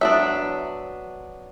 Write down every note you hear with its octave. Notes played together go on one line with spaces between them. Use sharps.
F#3 B3 D4 E5